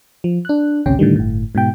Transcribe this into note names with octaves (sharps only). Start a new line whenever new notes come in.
F3
D4 F#6
A1 D2 C3 C#4 G5
A2 D3 D#3 G3
G1 A2
G#2 B2 G5